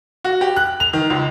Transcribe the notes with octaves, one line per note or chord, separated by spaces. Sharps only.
F#4
G4
F#6
F7
D#3
C#2